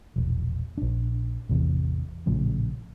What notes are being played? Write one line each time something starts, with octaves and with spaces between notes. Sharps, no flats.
E1 A#1
A#1 D4
A1 E2 C3 E3
A#1 A2 C#3 F3